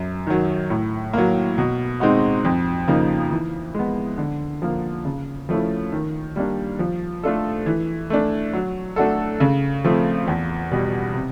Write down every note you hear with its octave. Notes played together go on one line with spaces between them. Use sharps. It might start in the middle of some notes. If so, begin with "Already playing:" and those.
Already playing: F#2
D#3 F#3
A2
F#3 A#3
B2
G#3 C4 D#4 F#4
F2
C#3 F3 A#3 D#4
E3
G#3 B3
D3
F3 A#3
C#3
F3 A3 C#4 E4
D#3
G3 A#3 D4
F3
A3 D4 F4 A4
E3
A3 D4
F#3
A3 D4 F#4 A4
C#3
F3 A3 C4 F4
E2
B2 G3
C3